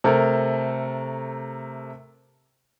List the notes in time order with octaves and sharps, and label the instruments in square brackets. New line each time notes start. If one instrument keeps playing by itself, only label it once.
[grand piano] C3 A3 A4 A#4